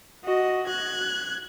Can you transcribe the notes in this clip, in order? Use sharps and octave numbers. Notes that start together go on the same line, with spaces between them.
F#4 D#5
F#6 G#6